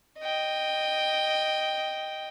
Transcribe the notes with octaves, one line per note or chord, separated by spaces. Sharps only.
D#5 G5